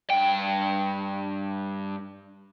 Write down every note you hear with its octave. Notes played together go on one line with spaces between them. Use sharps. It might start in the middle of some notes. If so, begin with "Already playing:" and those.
G2 G5